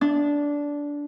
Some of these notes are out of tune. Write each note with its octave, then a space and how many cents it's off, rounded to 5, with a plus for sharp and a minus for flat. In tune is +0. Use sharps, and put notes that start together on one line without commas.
D4 -15